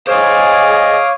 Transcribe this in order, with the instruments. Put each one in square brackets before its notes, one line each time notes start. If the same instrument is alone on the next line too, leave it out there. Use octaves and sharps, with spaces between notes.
[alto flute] G#4 [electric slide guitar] C5 D#5 [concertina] C#5 [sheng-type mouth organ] F5 D6 D#6